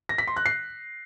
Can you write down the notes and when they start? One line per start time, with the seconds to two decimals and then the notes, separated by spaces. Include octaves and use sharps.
0.09 A#6
0.18 B6
0.27 C6
0.36 F#6
0.46 C7